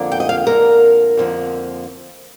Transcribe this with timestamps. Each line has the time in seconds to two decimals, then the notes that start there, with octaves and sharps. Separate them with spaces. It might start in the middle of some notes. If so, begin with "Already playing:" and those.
Already playing: F2 D3 F3 A#3
0.12 G5
0.20 D#5
0.29 F5
0.47 F2 D3 F3 A#3 A#4
1.17 F2 D3 F3 A#3